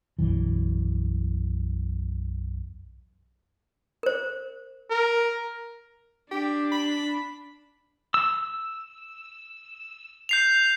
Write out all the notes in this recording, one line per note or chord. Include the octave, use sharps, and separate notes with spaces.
B1 F#2 E3
A#4 C5
A#4
D4 G4
B5
E6
G6 C7 F7